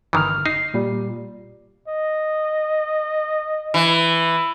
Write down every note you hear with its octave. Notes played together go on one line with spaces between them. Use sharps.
G1 D#3 E3 F6
D#4 C7
A#2 G3
D#5
E3